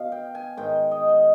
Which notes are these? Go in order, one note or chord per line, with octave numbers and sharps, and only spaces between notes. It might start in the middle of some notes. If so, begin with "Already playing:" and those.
Already playing: B2 F5
G5
G#5
G#2 D#3 G5
D#5
D#5